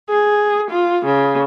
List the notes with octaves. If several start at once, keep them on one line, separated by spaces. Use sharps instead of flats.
G#4
F4
C#3